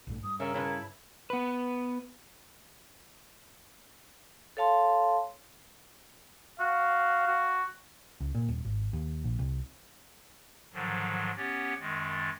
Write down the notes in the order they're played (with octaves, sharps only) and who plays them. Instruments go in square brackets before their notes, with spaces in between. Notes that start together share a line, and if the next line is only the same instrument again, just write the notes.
[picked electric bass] A#1 G2 A3
[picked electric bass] G2 [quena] D#6
[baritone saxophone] C#3 [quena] A#4 [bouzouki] E5
[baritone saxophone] C#3 [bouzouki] E4 A4 B4
[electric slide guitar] B3 B4
[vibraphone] A4 C#5 F5 A5 C6
[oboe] F#4 [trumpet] F5
[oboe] F#4
[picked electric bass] C#2
A#2
D#1
G#1
D#2
A#1
C2
[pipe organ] G#2 D3 D#3 F3 F#3
B3 C#4 G4 C#5 F#5 A6
F#2 D#3 G#3 A6